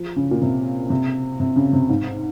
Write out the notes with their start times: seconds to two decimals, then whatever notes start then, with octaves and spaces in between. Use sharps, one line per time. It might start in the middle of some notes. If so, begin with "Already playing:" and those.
Already playing: F3
0.16 C#3
0.31 A#2
0.42 C3
0.90 C3
1.40 C3
1.56 C#3
1.73 C3
1.89 G#2